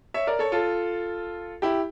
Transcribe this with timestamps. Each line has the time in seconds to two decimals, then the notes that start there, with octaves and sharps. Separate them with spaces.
0.14 C#5 E5
0.27 A#4 D5
0.39 A4 C#5
0.52 F4 A4
1.62 E4 G4